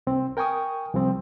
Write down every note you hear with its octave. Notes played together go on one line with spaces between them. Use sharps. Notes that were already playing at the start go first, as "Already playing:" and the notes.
C2 C4
A#4 G5 G#5 C#6 D#6
C2 F3 G3 C4